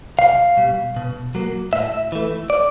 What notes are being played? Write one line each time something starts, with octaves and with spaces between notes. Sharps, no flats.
C2 F5
B2 G3
B2
F#3 A#3
A2 E5
E3 A3
D5